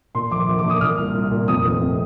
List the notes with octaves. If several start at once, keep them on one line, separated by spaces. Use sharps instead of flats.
A#2 C6
A#1 D6
A#1
D6
A#2
D#6
A#2 F6
C2
C2
A#2
F2 D#6
F1
C3